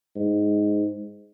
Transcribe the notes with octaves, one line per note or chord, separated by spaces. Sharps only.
G#2